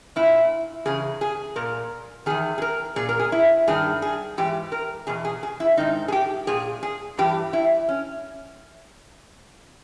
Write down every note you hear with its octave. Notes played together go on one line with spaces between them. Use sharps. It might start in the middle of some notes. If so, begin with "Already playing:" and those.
A#2 E4
E2 C#3 G#4
G#4
A#2 A#4
E2 D#3 G#4
G#4
A#4
A#2 G#4
A#4
G#4
E4
G2 D#3 G#4
G#4
G#2 E3 G4
A#4
E2 B2 G#4
G#4
G#4
E4
G#2 D#3 D#4
G#4
G4
A#2 G#4
G#4
G2 E3 G4
E4
C#4